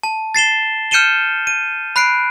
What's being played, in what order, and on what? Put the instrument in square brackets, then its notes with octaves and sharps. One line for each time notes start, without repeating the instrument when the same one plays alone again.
[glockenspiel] A5
A6 C7 E7 G7
F6 G6 C#7 D#7 E7 G7
D#7
B5 F#6 C7 D7